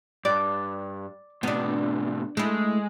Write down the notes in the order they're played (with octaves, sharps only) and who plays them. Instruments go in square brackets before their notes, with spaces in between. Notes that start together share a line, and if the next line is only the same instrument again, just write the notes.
[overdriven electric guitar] G2 [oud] D5
[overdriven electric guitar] A2 C3 [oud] B3 D4
[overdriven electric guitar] G#3 [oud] A3 E4